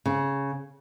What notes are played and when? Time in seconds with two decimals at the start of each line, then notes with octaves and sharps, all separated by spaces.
0.06 C#3